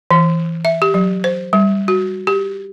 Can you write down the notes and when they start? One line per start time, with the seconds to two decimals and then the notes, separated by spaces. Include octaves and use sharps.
0.11 E3
0.65 E5
0.82 G4
0.94 F#3
1.24 C5
1.53 G3
1.88 F#4
2.27 G4